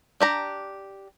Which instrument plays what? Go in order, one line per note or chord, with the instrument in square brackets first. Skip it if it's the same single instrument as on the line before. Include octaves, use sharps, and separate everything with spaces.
[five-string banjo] D4 G4 A#5